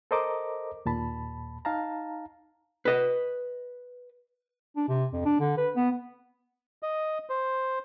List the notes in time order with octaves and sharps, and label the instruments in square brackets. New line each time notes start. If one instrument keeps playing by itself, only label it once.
[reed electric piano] A4 A#4 C5 D#5 A#5 D6
D#2 A#2 A5 B5
D#4 F5 A5 A#5
[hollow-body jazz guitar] B4 D#5
[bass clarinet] D4
C3
F2
D4
D3
B4
B3
[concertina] D#5
C5